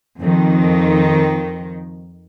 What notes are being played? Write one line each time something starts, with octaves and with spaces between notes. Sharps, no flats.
F2 D#3